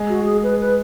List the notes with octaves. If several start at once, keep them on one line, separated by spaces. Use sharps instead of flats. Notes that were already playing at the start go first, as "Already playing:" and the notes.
Already playing: G#3
F#4
G#4
B4
B4